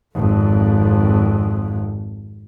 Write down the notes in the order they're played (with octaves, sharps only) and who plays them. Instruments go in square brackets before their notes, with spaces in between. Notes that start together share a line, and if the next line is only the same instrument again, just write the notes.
[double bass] G#1 F2